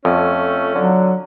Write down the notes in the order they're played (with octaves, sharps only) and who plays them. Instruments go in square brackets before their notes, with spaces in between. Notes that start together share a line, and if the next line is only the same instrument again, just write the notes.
[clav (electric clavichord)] F2 [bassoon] A3 [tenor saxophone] C#4
[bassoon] D3 [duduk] F#3